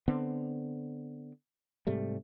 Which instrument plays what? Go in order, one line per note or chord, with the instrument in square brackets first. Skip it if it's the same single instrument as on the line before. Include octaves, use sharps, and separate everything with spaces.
[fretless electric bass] D3 B3 C4
G#2 C3 G3 A3